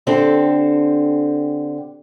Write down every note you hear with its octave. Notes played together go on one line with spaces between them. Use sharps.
D3 C4 G4 A4